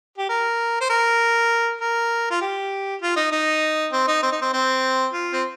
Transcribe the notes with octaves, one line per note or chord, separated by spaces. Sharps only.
G4
A#4
C5
A#4
A#4
F4
G4
F4
D#4
D#4
C4
D#4
C4
D#4
C4
C4
F4
C4